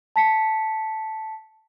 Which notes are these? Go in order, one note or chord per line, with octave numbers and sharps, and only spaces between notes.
A5 B6 C#7